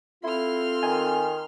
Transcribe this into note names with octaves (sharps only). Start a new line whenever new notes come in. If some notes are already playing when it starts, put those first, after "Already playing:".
C4 E4 F4 A4 C6 F6
D#3 G#5